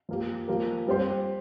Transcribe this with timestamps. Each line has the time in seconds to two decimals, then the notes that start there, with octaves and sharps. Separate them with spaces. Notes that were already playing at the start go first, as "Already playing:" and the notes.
0.09 F3 A#3 G4
0.48 F3 A#3 G4 A#4
0.87 G3 C4 G4 C5